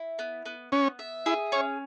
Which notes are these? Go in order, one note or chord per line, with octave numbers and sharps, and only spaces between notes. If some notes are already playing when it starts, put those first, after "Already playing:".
Already playing: E4
B3
B3
B3 C#4
E5
E4 G#4
C#4 C#5